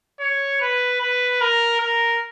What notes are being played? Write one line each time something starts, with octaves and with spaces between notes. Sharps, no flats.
C#5
B4
B4
A#4
A#4